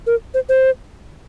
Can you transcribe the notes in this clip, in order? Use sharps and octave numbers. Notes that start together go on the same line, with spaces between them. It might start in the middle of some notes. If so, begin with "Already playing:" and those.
A#4
C5
C5